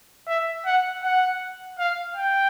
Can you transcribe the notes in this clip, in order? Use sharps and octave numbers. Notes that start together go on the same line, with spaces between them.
E5
F#5
F#5
F5
G5